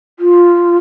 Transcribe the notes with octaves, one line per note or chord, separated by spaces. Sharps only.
F4